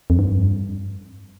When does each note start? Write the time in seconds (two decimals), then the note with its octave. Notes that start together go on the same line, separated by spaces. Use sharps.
0.10 F2
0.19 G2